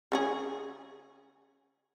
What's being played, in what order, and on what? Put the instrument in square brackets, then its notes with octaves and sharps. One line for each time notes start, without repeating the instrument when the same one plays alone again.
[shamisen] C#3 C#4 G#4